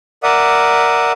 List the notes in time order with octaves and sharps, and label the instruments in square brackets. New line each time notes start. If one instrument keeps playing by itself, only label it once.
[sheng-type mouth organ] A#4 D5 E5 F#5 D#6